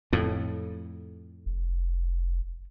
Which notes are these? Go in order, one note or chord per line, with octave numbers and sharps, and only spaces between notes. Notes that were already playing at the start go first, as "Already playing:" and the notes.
F2 A2
F1